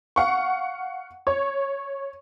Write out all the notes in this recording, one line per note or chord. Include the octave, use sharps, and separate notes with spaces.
F5 F#5 C#6
C#5